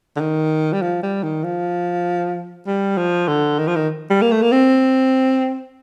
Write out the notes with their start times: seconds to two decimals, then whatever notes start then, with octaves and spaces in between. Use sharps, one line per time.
0.16 D3
0.20 D#3
0.73 G3
0.82 F3
1.03 G3
1.23 D#3
1.44 F3
2.67 G3
2.97 F3
3.28 D3
3.59 D#3
3.67 F3
3.76 D#3
4.10 G3
4.22 A#3
4.31 A3
4.42 A#3
4.52 C4